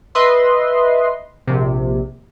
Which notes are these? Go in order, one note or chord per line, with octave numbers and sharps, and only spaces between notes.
B4 D#5 E5 C6
A#1 C3